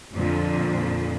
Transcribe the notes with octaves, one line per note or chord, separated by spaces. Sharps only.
F2 A#2 D3 F3